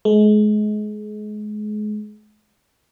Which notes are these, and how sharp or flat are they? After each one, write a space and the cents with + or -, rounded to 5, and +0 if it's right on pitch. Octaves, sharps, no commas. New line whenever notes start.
G#3 +30